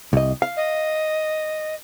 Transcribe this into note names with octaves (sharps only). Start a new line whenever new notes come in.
C2 D#5
F5
D#5